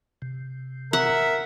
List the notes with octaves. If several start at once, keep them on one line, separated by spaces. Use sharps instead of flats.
C3
A#4 E5 F#5